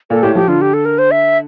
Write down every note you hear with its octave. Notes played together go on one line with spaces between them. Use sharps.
A#2 A4
A2 G4
F3 G4
D3 F4
G4
A4
A#4
C5
E5